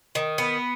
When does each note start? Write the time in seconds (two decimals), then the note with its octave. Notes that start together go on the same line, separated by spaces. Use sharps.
0.15 D#3
0.38 B3